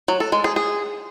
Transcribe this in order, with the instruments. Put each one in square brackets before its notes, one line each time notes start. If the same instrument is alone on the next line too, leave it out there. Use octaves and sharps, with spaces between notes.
[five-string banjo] F#3
A4
G#3
G#4
G#4